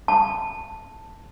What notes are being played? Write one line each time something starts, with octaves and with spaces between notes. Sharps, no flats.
A5